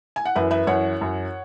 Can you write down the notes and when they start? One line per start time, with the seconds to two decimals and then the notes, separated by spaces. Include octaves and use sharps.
0.16 G#5
0.25 F#5
0.36 F#2 E3 B4 E5
0.51 B4 E5
0.67 F#2 E3 C#5 F#5
0.99 F#2 E3